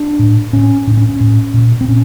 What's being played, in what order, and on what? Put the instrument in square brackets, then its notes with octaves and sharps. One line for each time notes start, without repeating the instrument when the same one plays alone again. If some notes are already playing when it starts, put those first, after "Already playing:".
Already playing: [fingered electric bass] D4
A2
A2 C#4
A2 D4
C#4
C#4
A2
A#2
C4
A#2 C#4